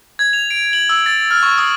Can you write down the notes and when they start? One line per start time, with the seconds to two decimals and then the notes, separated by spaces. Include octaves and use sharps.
0.19 G#6
0.33 F7
0.51 D7
0.73 F#7
0.89 E6
1.06 A6
1.31 F6
1.43 C#6
1.58 D#6